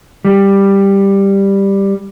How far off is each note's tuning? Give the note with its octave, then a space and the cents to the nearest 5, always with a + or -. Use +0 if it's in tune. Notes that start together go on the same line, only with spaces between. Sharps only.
G3 +5